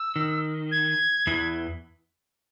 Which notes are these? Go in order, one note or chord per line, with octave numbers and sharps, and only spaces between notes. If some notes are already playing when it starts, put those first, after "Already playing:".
Already playing: E6
D#3
G#6
E2 E3